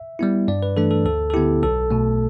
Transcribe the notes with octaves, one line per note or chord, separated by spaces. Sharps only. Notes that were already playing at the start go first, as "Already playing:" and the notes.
Already playing: E5
G3 B3 E4
G2 D5
B4
E3 A3 D4 A4
A4
D2 A4
A4
D3 B3 E4 G4
B1 A4
B2 A3